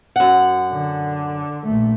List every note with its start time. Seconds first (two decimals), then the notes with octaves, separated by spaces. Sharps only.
0.16 F#2 F#5
0.72 D3
1.66 A#1 A3